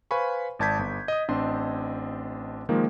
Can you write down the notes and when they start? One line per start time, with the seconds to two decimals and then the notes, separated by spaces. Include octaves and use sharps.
0.11 B4 C5 F5 G#5 B5 C#6
0.59 G#1 D5 A5 G6 G#6 B6
0.79 G1
1.08 D#5 D#6
1.28 A1 C4 D4 D#5 C6
2.69 D#3 F3 G#3 A#3